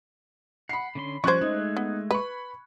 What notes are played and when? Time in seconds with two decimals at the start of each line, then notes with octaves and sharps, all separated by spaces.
0.69 F#5 B5 C7
0.95 D3 C#4 C6
1.24 F3 G3 C#4 C5 C#6 F#6 G#6
1.41 G#3 A3 D#4
1.77 B3
2.11 B4 B5 C#6